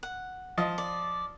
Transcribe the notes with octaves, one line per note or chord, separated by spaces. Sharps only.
F#5
F3 D#5
D5